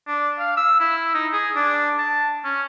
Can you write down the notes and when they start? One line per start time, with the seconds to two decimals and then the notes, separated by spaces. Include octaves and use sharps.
0.07 D4
0.39 F5
0.57 E6
0.80 E4
1.14 D#4
1.33 G#4
1.56 D4
1.99 A5
2.44 C#4